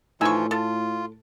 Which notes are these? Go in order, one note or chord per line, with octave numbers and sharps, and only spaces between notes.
A2 E3 F3 D#4 F4 G#5 C#6 E6
F4 A4